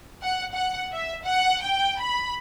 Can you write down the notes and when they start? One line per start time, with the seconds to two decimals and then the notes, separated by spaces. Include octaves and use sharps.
0.22 F#5
0.54 F#5
0.93 E5
1.24 F#5
1.63 G5
2.01 B5